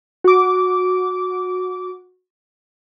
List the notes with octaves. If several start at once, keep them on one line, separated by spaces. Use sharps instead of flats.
F#4 D6